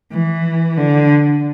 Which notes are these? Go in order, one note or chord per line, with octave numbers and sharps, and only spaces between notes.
E3
D3